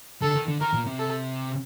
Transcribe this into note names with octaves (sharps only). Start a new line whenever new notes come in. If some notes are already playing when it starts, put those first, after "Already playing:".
D3 A4
D#3
D3
D#3 A#4
A#2
C3
A4